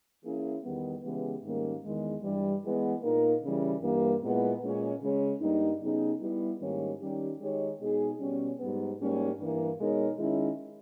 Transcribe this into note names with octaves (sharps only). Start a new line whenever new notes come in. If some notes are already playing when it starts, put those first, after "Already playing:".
E3 A#3 C#4 E4 G#4
E2 D#3 G3 B3
C#3 E3 G#3 B3 G4
G#2 D#3 G3 A#3 C#4
E2 D#3 G#3
G2 E3 G3
E3 G#3 B3
A#2 A#3 D#4 A#4
C#3 E3 G3
G2 E3 G3 A#3
A#2 G#3 B3 E4
A#2 G#3 C#4
C#3 G#3 C#4
G2 G3 A#3 D#4
C#3 G3 B3 D#4 G#4
G3 B3 E4
G#2 D#3 G3 A#3 C#4
D#3 G3 C#4 G4
D#3 G#3 D#4 G4 C#5
B2 G#3 D#4 G#4
B2 G3 C#4
G#2 G3 B3
G#2 G3 A#3 C#4
G2 E3 A#3
B2 G#3 D#4 A#4 C#5
D#3 G#3 C#4 E4